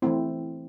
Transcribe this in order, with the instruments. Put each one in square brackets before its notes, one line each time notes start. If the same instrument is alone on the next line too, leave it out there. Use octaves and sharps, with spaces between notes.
[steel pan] E3 A3 C4 E4